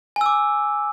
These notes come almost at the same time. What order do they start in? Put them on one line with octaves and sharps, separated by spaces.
G#5 E6 D6